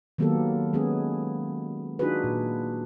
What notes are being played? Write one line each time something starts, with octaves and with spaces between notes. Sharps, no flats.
D#3 F#3 A#3 B3 G4 A4
G#3 B3 C#4 G#4
D4 D#4 F4 F#4 G#4 B4
A#2